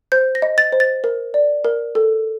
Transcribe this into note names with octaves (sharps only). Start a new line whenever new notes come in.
C5 G6
A#6
D#5
A6
C5
A6
A#4
D5
A#4
A4